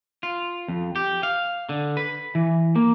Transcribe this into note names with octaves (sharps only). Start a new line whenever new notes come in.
F4
F2
G4
F5
D3
B4
E3
A#3